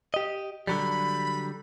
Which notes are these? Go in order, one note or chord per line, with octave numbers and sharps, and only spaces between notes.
G4 D#5
D3 F#3 G3 B5